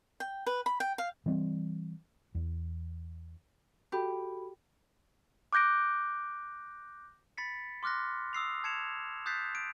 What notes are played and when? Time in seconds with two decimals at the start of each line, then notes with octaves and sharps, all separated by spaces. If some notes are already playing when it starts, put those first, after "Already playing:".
0.20 G5
0.46 B4
0.66 B5
0.80 G5
0.98 F5
1.26 E3 G3 C4
2.35 E2
3.92 F#4 G4 A4 B5
5.53 D6 F#6 G6 A#6 D7
7.37 B5 A6 B6 C#7
7.83 C6 D6 F6 F#6 A#6
8.33 D#6 E6 C7 F7
8.64 A5 G#6 C7 C#7 E7 F7
9.26 D#6 F#6 G6 A6 B6 C7
9.55 D7